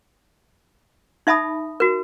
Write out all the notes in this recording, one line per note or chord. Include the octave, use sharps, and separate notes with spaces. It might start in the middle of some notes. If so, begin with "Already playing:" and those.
D#4 E5 A5 B5 D#6
F#4 A#4